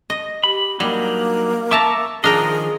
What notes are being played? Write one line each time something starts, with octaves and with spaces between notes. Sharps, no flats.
D#5
G4 B5
F#3 G3 A#3 D4 D#4
E5 A5 A#5 C#6 D6 E6
D#3 F3 D4 G#4 A#4 D#5 G5